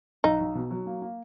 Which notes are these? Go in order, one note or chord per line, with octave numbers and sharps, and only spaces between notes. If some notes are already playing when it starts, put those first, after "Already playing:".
B1 D#4
B1
B2
F#3
A#3
A#3